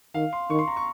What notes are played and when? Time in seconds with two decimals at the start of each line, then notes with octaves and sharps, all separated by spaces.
0.14 D#3 F5
0.33 C6
0.50 D#3 C#6
0.59 C6
0.68 A#5
0.76 C#6